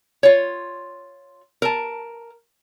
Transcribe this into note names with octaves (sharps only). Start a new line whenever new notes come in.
F4 C#5
A#4 A5